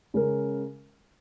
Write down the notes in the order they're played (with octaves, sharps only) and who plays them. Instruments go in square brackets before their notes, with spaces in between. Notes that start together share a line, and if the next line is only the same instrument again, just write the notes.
[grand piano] C#3 G#3 C#4 A#4